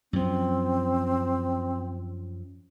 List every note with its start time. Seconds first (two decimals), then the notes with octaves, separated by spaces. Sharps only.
0.13 F#2 F3 C4